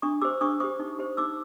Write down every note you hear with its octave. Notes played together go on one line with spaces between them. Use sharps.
D4 C#6 D#6
G4 C5 D6 E6
D4 C#6 D#6
G4 C5 C#6 D#6
D#4
G4 C5
D#4 D6 E6